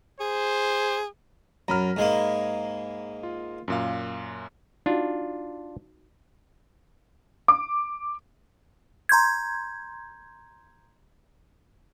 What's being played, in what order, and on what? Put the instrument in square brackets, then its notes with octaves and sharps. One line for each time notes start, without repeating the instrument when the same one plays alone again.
[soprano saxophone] G#4 [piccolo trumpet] C5
[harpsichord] F#2 [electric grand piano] A#5 B5 F6
[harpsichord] G#2 G#3 A#3
[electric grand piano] F4
F#2 A#2 F5
[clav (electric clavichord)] D4 F4 [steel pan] D#4 F#4
[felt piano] D6
[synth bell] A#5 C6 G6 G#6